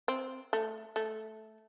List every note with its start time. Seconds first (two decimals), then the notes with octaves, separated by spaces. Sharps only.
0.08 C4
0.53 A3
0.96 A3